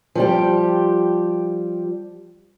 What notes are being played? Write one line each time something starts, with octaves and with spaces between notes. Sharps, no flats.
F3 G3 G4